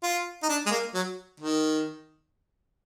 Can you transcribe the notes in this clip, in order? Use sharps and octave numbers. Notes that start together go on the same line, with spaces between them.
F4
D#4
D4
G#3
A#3
F#3
D#3